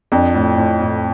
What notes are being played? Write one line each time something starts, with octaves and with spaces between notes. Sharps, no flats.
F2 D4
A2
A2
A2